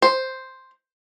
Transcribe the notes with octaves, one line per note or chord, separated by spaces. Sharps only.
C5